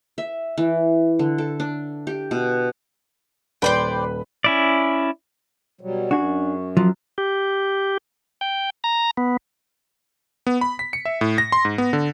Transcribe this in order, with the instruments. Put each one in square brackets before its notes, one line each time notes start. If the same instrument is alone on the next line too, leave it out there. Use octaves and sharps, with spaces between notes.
[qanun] E5
E3
D3
A4
D4
G4
B2
[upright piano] D#1 B4 B5 [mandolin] C5 D5 G5
[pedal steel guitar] C#4 E4 D5
[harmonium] B2 F#3 G3
[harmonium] F#2 [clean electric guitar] D4 G#4 [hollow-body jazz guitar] F#4
[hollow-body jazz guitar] F3 [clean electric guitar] F#3
[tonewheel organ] G4
G5
A#5
B3
[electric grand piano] B3
B5
B6
C#7
E5
A2
A#6
C6
G#2
B3
D3